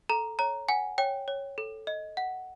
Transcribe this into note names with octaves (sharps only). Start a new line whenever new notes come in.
A4 A#5
C#5 A#5
F#5 G#5
C#5 G5
C#5
A4
D#5
F#5